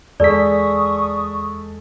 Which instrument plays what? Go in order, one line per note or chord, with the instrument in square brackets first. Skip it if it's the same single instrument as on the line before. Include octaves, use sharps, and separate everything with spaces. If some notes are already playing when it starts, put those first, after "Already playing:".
[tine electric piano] E2 B6 [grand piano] G#3 A4 [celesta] D5 [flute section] C#6 D#6